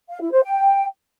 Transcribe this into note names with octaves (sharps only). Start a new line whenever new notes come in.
F5
E4
C5
G5